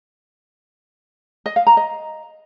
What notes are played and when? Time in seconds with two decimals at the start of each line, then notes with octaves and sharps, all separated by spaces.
1.46 D#5
1.56 F5
1.67 A#5
1.77 D#5